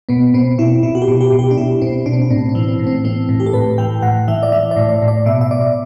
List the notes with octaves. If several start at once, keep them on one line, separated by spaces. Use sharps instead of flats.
B2 B3
B2 C4
B2 E4
B2 E4
F#4
G4
B2
G4
B2
G4
D4
B2 E4
B2 C4
B2 D4
C4
D4
A2 C4
C4
E3
C4
A2
C4
E3 C4
A2
G4
A4
A2 B4
E3 G5
A2 F#5
E3 E5
D5
E3 E5
D5
A2
D5
A2
D5
B2 E5
E5
B2 D5